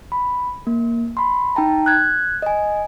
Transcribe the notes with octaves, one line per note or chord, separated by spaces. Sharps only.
B5
A#3
B5 C6
D#4 G5 A5 A#5
F#6 G#6
D#5 G#5